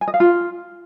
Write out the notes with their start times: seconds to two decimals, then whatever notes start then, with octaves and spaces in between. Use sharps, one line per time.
0.01 G#5
0.08 D#5
0.14 F5
0.20 F4